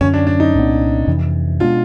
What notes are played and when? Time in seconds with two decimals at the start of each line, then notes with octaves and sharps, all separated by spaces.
0.01 F#2 D3 F#3 C#4
0.14 D4
0.27 D4
0.40 D#4
0.54 C2 A#2 G3 B3
1.07 F2 C3 E3
1.60 B2 G#3 B3 D4 F4